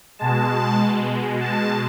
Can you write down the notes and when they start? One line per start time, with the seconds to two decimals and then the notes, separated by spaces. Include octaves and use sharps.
0.19 B2 G#3 A5
1.40 A5